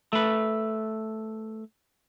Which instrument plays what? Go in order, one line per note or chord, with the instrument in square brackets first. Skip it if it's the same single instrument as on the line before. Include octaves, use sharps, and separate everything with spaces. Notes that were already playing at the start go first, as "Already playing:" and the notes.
[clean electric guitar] A3 B4